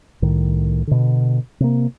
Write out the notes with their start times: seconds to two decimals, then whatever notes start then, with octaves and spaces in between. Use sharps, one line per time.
0.22 C2 A2 D#3
0.87 B2 D3
1.60 C3 A#3